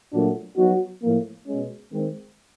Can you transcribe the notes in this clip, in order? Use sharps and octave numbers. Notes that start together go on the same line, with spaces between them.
A#2 F#3 A3 D4 F#4
F#3 B3 D#4 F#4
A2 F3 A#3
B2 G#3 C#4
D#3 G#3 C4